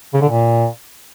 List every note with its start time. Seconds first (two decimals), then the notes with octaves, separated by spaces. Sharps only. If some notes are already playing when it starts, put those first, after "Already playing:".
0.14 C#3
0.21 D3
0.29 A#2